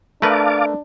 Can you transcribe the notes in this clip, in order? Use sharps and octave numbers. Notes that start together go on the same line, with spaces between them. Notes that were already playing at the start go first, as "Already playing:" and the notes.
A3 D4 A#4 B4 F5 A5 D6